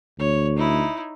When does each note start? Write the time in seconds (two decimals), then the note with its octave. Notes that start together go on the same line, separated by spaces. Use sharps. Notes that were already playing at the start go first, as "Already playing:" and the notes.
0.19 D2 C#5
0.57 D#4 E4